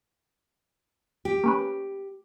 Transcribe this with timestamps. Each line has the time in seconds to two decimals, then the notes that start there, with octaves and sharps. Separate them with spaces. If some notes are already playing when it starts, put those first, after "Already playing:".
1.25 G4
1.44 A#3 C#4 B4